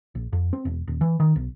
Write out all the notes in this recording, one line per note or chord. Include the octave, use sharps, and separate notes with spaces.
A#1
F2
C4
E1
D#1
E3
D#3
B1